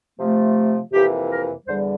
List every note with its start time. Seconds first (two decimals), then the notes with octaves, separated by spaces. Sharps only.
0.18 C3 F3 A3
0.92 F2 C3 E3 A#3 G4
1.30 A#4
1.66 E2 D3 G3 C5